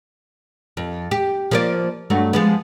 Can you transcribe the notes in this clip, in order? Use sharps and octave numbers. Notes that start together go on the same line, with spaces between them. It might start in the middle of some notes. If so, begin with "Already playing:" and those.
F2
G4
F3 A#3 D5
G2 F#3 A3
F3 G#3 B3